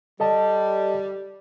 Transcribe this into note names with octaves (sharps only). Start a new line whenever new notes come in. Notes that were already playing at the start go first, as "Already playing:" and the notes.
G3 A4 D#5 A5